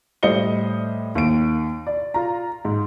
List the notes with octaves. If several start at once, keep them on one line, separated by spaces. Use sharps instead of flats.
A2 G3 C5 D#5 C#7 G7
D#2 D7
D5
F4 A#5
G#2